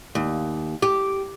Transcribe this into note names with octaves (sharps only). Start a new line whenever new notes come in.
D#2
G4